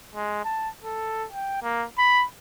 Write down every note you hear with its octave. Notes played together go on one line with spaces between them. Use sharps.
G#3
A5
A4
G5
A#3
B5